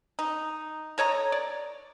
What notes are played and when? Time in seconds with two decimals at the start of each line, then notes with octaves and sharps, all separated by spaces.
0.19 D#4
0.98 A4 C#5 D#5 A#5
1.32 D5